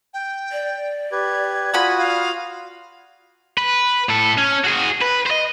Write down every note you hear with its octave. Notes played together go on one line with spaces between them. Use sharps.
G5
D5
G4 B4 G#6
F4 F#4 F#5 G#5 B5 D#6
F5
B4
A2 A4
C#4
F#4 G#4
B4
C5 D#5